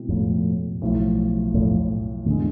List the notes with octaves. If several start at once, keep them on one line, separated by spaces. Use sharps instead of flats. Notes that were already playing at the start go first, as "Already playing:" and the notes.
Already playing: B2 G#3 C4 E4
F2 A2
B1 A2 F3
F2 A2
E2 A2 D3 G#3